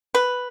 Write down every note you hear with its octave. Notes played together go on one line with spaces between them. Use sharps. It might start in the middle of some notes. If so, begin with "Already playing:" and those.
B4